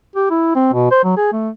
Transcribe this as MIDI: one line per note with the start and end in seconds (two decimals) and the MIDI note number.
0.16 0.27 67
0.30 0.54 64
0.55 0.70 60
0.73 0.89 47
0.91 1.00 72
1.04 1.15 54
1.17 1.31 68
1.33 1.50 57